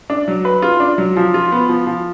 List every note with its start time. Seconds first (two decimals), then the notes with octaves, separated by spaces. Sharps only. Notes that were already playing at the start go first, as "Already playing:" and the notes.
0.10 D4
0.28 F#3
0.45 B4
0.62 F4
0.80 D4
0.98 F#3
1.17 F3
1.34 F4
1.52 B3
1.69 F3
1.87 F3